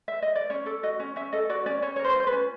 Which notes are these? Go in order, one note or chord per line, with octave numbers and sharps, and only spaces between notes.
E5
D#5
D5
C#4 C#5
A4 D5
F#4 D#5
C#4
C#4 E5
A4 D#5
F#4 D5
C#4 D5
C#4 C#5
C#5
A#4
C5
F4 C5
B4
C#4